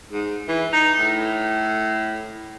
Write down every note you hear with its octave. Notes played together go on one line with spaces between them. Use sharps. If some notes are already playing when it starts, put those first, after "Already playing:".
G#2
E3
D#4
A2